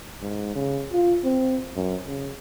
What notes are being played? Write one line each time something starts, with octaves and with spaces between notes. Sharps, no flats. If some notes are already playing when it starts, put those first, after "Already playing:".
G#2
C#3
F4
C4
F#2
C#3